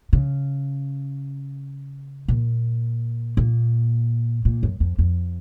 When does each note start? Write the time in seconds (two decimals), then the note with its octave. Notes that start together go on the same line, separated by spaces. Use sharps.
0.13 C#3
2.28 A#2
3.37 A#2
4.45 A#2
4.63 F#2
4.80 F2
4.98 F2